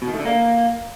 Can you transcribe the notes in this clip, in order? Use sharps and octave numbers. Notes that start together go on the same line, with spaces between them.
B2
D#3
A3
D3
A#3